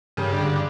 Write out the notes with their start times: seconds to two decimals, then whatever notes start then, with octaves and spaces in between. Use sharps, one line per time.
0.17 G2 C#3
0.33 D3